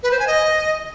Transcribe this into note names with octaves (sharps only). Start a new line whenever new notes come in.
B4
C5
G#5
D#5